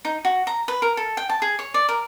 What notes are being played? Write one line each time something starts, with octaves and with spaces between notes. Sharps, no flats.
D#4
F#4
A#5
B4
A#4
A4
G5
A5
G#4
C#5
D5
A#4